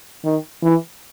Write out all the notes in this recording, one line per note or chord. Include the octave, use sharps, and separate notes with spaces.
D#3
E3